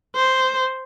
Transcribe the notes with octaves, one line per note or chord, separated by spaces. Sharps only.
C5